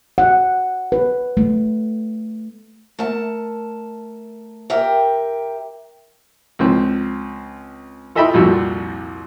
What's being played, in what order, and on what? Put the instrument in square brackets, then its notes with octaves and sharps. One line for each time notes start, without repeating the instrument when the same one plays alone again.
[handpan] F#5
B4
A3
[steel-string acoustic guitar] A3 A#4 A5
G4 A#4 E5 G5
[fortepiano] C#2 F3 C4
F4 A4 D#5 E5 G5 B5
C2 F2 A#2 F3 F#4 E6